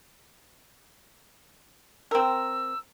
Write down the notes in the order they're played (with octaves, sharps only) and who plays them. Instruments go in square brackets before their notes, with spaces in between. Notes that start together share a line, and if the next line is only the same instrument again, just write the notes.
[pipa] C4 A#4 [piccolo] E6